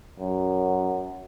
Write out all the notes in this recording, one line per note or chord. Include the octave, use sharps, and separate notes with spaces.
F#2